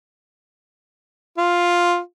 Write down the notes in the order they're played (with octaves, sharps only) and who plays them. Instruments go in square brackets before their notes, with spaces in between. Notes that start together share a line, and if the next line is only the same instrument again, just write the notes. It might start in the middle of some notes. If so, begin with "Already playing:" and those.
[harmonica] F4